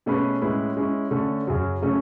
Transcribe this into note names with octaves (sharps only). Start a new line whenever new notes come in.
B2 A3 C#4 G#4 B4
A2 G#3 C#4 E4 B4
G#3 C#4 E4
D3 A3 C#4
F#2 C#3 F#3 C#4
C#3 F#3 A3 C#4